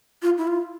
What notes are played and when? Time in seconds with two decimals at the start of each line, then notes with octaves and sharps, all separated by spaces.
0.22 F4
0.38 E4
0.47 F4